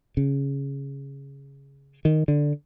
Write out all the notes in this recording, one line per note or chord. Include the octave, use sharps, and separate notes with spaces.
C#3
D#3
D3